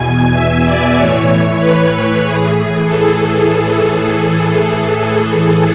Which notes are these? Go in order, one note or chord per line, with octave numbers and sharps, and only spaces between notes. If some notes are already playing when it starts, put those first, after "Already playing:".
Already playing: E2 B2 G#5
E5
D5
A2 E3 C#5
B4
A2 E3 G#4
G#4
A4